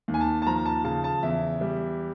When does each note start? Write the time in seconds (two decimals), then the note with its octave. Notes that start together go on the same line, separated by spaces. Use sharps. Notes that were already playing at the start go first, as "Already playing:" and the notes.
0.08 D#2
0.14 G#5
0.21 A5
0.42 A5
0.47 F3 A#5
0.66 A5
0.84 C#3 A5
1.04 A5
1.23 E2 E5
1.61 G3